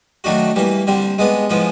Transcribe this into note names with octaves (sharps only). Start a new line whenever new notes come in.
D#3 F#3 A3 D4 F#4
E3 G3 A#3
D3 G3 C4
G#3 B3 D4
A2 F3 G#3 B3